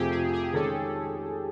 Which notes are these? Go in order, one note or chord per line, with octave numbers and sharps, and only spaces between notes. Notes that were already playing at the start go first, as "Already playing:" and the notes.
Already playing: F2 C3 F3 A3 C4 G4 G#4
G#4
G4
G#4
D#3 G#3 C#4 A4